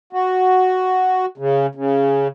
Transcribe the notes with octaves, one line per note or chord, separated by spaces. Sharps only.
F#4
C#3
C#3